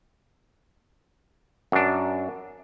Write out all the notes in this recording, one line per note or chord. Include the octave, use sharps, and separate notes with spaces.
F#2 D4